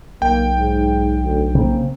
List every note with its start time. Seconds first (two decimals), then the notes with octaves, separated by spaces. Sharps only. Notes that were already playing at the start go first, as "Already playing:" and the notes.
0.22 B1 A#3 G5
0.58 G#2
1.24 D2
1.55 C#3 A#3 C4